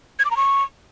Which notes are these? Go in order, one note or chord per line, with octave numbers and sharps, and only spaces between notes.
G#6
D6
A#5
C#6